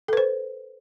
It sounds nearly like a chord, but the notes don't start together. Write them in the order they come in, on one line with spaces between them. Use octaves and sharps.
A4 B4 C5